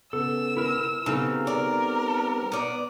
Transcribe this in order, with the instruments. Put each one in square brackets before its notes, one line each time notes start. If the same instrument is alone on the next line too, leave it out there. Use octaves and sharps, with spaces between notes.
[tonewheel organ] C#3 B3 [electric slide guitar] A4 [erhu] E6
[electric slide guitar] E4 A#4
[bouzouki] C#3 [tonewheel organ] G3 B3 C4 [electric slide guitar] D#4 A4 A#5
[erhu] A#4 [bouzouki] D5
[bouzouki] B3 D5 [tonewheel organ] D#6